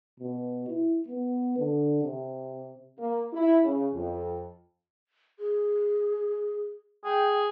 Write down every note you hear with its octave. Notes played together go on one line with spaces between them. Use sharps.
B2
E4
B3
D3
C3
A#3
E4
C#3
F2
G#4
G#4 G5